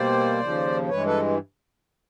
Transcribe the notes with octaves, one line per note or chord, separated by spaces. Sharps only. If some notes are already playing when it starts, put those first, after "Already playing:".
Already playing: B2 G3 A#3 C5 D5
D#2 C#3 F3
G2 E3 G#3 B4 C#5
A4 B4